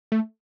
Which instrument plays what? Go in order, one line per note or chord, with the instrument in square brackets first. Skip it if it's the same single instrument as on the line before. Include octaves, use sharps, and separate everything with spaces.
[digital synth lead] A3